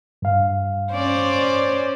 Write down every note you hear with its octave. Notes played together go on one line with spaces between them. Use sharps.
G2 F5
C#4 C5 D5